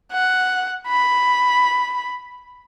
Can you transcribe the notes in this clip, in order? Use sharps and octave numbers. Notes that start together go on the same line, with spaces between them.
F#5
B5